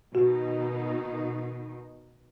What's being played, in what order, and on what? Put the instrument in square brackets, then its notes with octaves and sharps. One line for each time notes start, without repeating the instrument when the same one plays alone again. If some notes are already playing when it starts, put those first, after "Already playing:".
[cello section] B2 D#3 D#4 [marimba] F#4